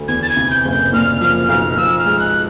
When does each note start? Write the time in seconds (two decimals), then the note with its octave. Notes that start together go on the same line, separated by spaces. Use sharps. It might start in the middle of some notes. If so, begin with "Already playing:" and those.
Already playing: D2
0.08 E2 G#6
0.22 A6
0.29 G#6
0.36 C3
0.51 G6
0.65 F#1
0.71 G6
0.93 A#2 F6
1.21 F3 F6
1.49 B1 F6
1.77 F3 E6
1.98 F6
2.05 G#3
2.19 F#6